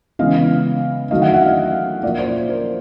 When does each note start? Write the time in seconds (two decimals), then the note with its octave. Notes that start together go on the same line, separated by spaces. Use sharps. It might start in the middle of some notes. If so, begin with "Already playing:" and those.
0.19 C#3 E3 G#3 B3 D#5 F5
1.11 D#3 F#3 A3 D#5 F5
1.22 E5 F#5
1.34 E5 F#5
1.45 D#5 F5
2.03 A#2 F3 A#3 D5 E5
2.18 C5 D5
2.49 A#4 C5